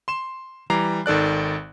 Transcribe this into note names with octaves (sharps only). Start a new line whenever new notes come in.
C6 E7
E3 G3 A#5 D6 C7
G#1 D#3 A4 D5 F#6